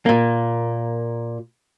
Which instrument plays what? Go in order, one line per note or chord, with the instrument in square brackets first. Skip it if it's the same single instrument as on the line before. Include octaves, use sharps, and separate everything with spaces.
[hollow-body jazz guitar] A#2 A#3